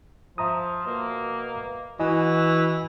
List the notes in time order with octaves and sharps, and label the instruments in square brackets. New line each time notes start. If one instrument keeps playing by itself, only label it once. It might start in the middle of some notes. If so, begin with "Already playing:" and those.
[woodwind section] F3 [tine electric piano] E5 A#5 D#6
[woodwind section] B2 A#3
[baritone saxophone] E3 [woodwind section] F#4 [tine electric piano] D#5 G#5